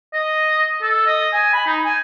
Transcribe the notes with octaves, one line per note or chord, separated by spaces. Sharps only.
D#5
A4
D#5
G#5
B5
D#4
G#5